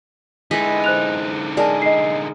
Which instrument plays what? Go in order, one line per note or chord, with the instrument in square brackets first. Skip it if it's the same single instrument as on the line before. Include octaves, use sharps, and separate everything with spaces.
[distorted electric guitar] D3 D#4 [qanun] G#3 E4 B4 [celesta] B6
[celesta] C5 F#6 F7
[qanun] G#3 G#4 A#4 [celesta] D5 A5
[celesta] D#5 C7